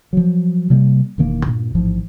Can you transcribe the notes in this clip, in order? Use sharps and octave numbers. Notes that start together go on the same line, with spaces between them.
F3 F#3
C3 G3 A#3
E1 D#3 A#3
G2 A#2
A1 G#2 F3